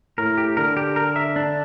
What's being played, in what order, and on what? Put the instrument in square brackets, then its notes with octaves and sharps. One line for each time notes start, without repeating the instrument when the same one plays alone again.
[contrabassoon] A2 [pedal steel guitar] A#4
[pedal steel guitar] G4
[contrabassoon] D3 [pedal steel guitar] A#4
[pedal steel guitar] G4
A#4
E5
D4